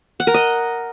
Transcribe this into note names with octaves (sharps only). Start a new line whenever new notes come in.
F#5
A#4
D#5